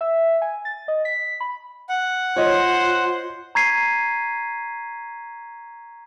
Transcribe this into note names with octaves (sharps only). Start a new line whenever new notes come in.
E5
G#5
A6
D#5
B6
B5
F#5
F4 C5 C#5 D#5
A#5 C#6 G#6 B6 C7 D#7